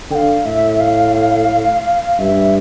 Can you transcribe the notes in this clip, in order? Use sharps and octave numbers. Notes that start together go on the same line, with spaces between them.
D3 F5 G5
A2 E5
F5
G2 E5